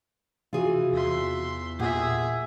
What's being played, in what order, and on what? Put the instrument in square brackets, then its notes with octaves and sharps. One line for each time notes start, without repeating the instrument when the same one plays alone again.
[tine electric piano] C3 F#4 [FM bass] E3 [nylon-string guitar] F4 G#4
[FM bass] E2 [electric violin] E5 C6
[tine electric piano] A#2 F#5 [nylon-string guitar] G4 [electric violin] G#4 E5